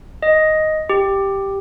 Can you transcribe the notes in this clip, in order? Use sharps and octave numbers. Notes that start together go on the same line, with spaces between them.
D#5
G4